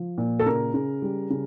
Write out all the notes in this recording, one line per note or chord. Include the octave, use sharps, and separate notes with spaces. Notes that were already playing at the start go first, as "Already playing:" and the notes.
Already playing: F3
A#2
A4
C#3 A#4
C#3
G3
C#3